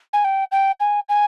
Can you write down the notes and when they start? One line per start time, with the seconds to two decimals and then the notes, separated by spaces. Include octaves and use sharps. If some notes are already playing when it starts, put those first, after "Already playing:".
0.13 G#5
0.24 G5
0.52 G5
0.80 G#5
1.09 G#5